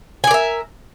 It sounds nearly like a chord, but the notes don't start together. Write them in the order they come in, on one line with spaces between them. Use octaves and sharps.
G#5 D5 A#4 E5